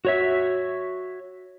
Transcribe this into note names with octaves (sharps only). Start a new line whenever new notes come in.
F#4 C#5 E5